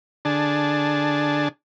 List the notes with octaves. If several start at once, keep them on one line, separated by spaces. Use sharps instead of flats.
D3 D4 G#4 A5